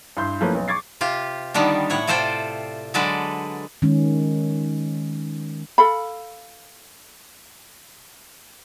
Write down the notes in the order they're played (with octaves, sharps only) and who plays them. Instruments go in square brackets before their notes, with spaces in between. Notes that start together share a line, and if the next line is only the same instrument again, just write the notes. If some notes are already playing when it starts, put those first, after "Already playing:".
[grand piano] G2 E4 C6 G6
F3 A3 A#3 C#4 E4 B4
B1 B3
C#6 D6 G#6 A6 C7
[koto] C3 F4 G4
D3 D#3 G3 B3 D4
A2 E4 C#5 F#5
C3 F4 A4 C5 D5 G5
D3 F#3 G#3 A4 B4 D5
[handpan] D#3 G#3 C#4
[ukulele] A4 F5 B5